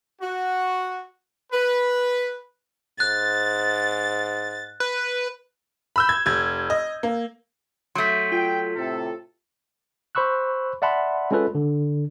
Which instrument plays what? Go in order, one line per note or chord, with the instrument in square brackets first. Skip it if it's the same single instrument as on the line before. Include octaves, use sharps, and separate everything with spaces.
[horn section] F#4
B4
[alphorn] G#2 [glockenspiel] F#6 [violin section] A6
[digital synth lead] B4
[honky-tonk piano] B5 E6 G6
G#6
F1 G#6
D#5
A#3
[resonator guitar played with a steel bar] F#3 A3 [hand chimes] C6 G6 B6
[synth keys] F4 [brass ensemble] G5
[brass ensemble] A2 C3 A4
[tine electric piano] C5 B5 C#6 E6 F#6
D5 E5 F#5 A5 B5 C6
G#3 C#4 F4 A4 B4
D3